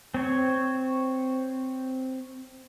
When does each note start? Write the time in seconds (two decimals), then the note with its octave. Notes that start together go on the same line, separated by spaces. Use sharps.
0.14 C4 C#5